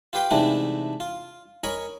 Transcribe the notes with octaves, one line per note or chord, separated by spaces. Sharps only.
F4 G4 B4 F5 G5
G#2 C3 E3 A3 D4 E4
F4
A#4 C#5 D#5 G#5 B5